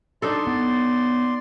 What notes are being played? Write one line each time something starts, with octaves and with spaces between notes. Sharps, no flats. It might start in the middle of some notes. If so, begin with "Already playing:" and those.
D4 D#4 A4 D5 C6
B3